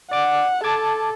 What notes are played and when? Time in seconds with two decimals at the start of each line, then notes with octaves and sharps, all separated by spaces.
0.11 D5 F#5 D6
0.64 A4 A5 D6 G#6